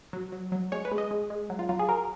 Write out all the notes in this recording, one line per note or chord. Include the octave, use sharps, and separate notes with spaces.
F#3
F#3
F#3
G#3 C#5
B4
G#3
D#5
G#3
G#3
F#3
F4
F#3 F4
G#4
F#3 A#4